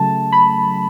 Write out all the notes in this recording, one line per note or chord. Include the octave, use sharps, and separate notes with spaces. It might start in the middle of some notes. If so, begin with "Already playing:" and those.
Already playing: C#3 F#3 A3 A5
B5